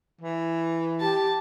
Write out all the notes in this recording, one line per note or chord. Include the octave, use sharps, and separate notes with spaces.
E3
G4 A5